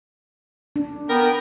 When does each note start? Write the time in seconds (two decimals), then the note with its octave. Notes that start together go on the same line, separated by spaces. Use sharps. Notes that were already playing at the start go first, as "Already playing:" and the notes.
0.76 D4
1.10 B3 A#4 G5